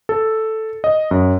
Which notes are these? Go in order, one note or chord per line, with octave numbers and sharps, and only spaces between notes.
A4
D#5
F#2